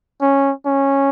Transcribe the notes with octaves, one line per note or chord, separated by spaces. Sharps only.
C#4
C#4